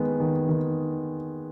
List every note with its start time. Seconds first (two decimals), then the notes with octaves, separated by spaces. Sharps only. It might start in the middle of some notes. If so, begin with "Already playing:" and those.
Already playing: D#3 G#3 B3
0.20 D#3
0.49 D#3